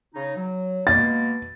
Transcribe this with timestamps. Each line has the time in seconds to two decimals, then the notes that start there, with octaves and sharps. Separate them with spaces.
0.14 C#3 D#4
0.36 F#3
0.87 B2 G#3 A#3 A6